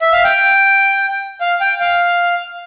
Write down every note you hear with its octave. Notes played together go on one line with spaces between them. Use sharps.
E5
F5
G5
F5
G5
F5